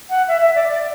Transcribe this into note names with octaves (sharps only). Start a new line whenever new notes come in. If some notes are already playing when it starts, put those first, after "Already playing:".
F#5
E5
E5
D5
D5